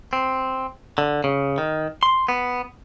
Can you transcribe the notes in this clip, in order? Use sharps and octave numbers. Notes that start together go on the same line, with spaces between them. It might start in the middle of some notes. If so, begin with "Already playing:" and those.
C4
D3
C#3
D#3
C6
B3